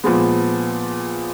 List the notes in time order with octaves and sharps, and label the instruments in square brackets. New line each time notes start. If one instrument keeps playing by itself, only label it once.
[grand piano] A#2 F3 G#3 B3